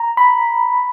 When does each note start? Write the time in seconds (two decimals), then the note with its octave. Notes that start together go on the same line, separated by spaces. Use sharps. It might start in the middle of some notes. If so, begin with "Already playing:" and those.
Already playing: A#5
0.17 B5